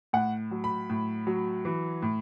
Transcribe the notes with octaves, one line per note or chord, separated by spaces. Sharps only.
A2 F#5
F#3
B5
A2
F#3
E3
A2